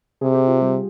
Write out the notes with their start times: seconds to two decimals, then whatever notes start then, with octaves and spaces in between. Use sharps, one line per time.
0.21 C3 G#4
0.34 G4
0.47 F4
0.61 G3 G4